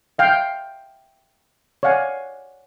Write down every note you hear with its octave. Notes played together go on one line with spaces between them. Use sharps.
E5 F5 G5
C#5 D5 F5 F#5 G#5